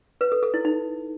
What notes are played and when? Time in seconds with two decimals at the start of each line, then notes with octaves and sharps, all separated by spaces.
0.21 B4
0.32 A4
0.43 A4
0.54 E4
0.65 D#4